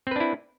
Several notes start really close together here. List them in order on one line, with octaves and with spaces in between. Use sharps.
C4 B4 D4 E4